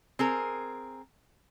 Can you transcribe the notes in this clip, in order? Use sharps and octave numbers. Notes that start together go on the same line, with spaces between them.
C4 G#4 A#4